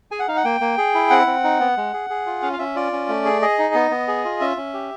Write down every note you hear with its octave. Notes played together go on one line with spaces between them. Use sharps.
G#4 G#5
F#5
D#4 F5
F#5
A#3 G5
A#3
G#4
E4
C4 F#5
C4
D#4
B3
G#3
G#4
G#4
F4
C#4 F5
F5
C#4 E5
F4 D5
C#4
A3
G#4
G#4 D#5
D#4
B3
B3
G#4
F4
C#4 E5
C#4
G4